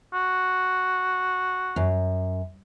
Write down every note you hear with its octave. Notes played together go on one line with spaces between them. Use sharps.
F#4
F#2